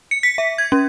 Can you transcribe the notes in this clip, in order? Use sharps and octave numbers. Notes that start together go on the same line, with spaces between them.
C#7
B6
E5
G#6
C#4